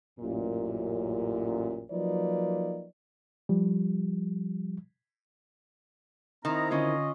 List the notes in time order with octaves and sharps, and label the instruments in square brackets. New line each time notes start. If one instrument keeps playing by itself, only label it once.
[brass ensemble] A1 F#2 A#2
F3 F#3 A#3 D#4 B4 D5
[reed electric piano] F3 G3
[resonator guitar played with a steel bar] D#3 [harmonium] C4 E4 [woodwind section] A#5
[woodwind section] D3 D#5 [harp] C#4 F4